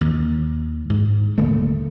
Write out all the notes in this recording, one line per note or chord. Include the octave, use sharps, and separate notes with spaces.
D#2
G#2
D#1 D3 A3 A#3